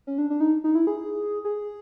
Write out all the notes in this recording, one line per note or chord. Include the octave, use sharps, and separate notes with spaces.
C#4
D4
D4
D#4
D#4
E4
G#4
G#4